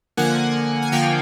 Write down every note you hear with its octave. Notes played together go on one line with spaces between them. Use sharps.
D3 F3 A#3 F#5 G#5
G#5
D3 F3 A#3 F5 G5